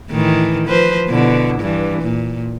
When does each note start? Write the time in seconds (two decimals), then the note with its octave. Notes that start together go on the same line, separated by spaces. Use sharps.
0.10 A2 D#3 E3
0.67 F3 B4 C5
1.07 B2 D3 E4
1.60 G2 E3
2.02 A#2